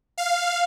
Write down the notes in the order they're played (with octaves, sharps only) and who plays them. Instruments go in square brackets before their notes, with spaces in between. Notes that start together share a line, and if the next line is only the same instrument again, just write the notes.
[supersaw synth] F5